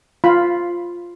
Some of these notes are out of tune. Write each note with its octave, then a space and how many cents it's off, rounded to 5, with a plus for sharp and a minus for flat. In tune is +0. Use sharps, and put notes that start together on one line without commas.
F4 +0 B5 +0